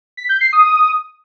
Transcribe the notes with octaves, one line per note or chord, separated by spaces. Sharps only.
B6
G6
C7
D#6